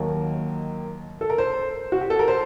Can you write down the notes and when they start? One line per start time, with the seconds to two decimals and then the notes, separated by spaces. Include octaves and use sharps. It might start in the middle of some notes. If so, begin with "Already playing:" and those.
Already playing: D#2 D#3 F#3 A#3
1.21 A4
1.30 A#4
1.38 C5
1.92 F#4
2.01 G4
2.10 A4
2.19 A#4
2.28 C5